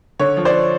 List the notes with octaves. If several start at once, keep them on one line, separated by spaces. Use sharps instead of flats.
D3 C#5
F3
C5 D5